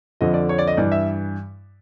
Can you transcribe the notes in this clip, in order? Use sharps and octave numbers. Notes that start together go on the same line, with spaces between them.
F2 D3 F3 D#5
D5
C#5
D5
D#5
G2 E3 D5
E5